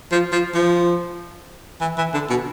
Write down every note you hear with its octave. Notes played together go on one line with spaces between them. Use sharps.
F3
F3
F3
E3
E3
D3
B2